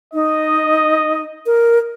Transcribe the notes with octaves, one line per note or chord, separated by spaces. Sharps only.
D#4 D#5
A#4